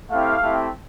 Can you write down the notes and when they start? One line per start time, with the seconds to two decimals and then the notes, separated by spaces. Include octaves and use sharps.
0.10 A3 C4 E4 G4 F5
0.42 A3 C4 E4 G4